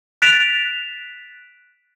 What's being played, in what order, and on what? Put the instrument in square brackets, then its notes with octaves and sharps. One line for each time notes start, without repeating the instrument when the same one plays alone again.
[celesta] F#6 A6 B6 D7 E7 F7